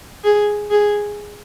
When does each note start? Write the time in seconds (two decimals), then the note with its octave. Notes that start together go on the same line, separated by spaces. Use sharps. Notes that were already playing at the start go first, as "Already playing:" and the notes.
0.24 G#4
0.71 G#4